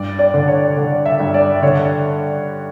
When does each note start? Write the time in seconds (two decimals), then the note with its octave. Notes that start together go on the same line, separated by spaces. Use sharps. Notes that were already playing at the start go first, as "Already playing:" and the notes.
Already playing: G2 D5
0.19 D5
0.34 D3
0.48 C#5
0.77 D3
1.06 E5
1.20 G2
1.34 D5
1.63 D3 C#5